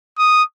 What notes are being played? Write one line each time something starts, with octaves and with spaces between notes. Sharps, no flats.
D#6